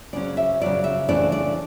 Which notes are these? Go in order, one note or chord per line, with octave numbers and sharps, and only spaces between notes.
C#3 F#3 C#4 D5
E5
C#3 F#3 C#4 D5
E5
C#3 E3 A3 D4 D5
D5